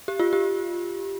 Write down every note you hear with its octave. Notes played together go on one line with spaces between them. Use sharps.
G4
F4
G4